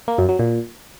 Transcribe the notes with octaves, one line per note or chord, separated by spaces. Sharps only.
A#3
F#2
F#3
A#2